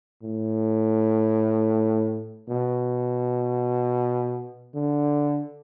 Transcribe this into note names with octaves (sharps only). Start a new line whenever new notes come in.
A2
B2
D3